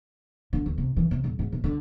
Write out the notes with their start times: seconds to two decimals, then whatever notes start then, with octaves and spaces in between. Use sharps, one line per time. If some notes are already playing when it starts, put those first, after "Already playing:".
0.53 D3
0.66 D2
0.78 C3
0.97 E3
1.11 C3
1.24 D#1
1.39 G#2
1.52 B2
1.64 D3